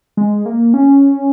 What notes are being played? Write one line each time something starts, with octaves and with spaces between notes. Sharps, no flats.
G#3
A#3
C#4